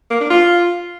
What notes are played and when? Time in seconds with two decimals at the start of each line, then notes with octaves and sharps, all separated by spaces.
0.11 A#3
0.20 D4
0.30 F4